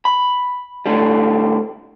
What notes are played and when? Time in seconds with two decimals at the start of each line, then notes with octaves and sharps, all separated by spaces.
0.05 B5
0.86 A2 D3 G3